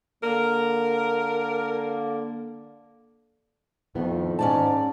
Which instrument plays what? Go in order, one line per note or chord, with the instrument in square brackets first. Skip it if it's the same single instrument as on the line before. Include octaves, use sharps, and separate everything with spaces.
[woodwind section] D3 A#3 [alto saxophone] A#4
[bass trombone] F2 [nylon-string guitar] A2 D#3 B3
[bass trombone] G#2 [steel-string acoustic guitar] C#4 D5 A5